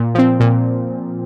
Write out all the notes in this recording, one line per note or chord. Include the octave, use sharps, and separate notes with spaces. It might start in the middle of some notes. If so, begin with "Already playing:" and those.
Already playing: A#2
F3 C4
A#2